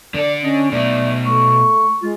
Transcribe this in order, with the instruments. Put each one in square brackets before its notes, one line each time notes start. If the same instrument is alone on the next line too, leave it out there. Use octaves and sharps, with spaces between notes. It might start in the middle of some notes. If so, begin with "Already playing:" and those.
[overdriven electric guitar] D3 A4 [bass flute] D5
[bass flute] C#4 [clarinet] D#5
[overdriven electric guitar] B2 D#4 [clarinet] A3 [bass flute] D5
[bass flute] A3 [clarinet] C#6
[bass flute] G#3 [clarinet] F4